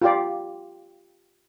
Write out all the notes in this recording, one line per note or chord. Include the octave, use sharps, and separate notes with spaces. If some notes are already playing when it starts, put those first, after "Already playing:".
F4 G4 D5